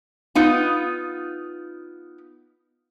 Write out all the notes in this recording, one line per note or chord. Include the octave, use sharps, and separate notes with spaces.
B3 D#4 F4